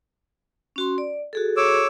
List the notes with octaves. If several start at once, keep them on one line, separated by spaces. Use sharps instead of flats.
C#4 F#4 C6
D5
F#4 G#4 A4
C#5 D6 E6